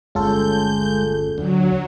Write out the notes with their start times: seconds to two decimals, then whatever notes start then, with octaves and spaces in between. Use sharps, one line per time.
0.15 G1 D2 G#3 C#4 F4 A4 G6
1.38 D2 F#3